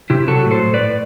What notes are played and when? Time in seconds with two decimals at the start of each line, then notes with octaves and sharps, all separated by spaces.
0.10 C3 E4 G4
0.28 F#3 F#4 A4
0.45 A2
0.51 A4 C5
0.62 A2
0.74 B4 D5
0.80 A2